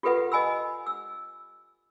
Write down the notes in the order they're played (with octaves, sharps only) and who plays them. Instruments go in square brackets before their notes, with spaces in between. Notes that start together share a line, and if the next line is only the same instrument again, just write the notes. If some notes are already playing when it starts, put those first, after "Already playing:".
[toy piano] F4 G4 A4 B4 E5 F#5
D#5 G#5 B5 E6
E6